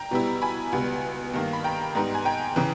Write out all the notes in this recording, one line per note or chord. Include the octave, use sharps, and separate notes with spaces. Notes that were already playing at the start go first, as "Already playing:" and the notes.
Already playing: G5 A#5
B2 G3 B3 E4
G#5 B5
C#2 B2 G3 B3
G2 D#3 A#3
B5
G5 A#5
G#2 G3 B3 D#4
G#5
G5 A#5
C#3 E3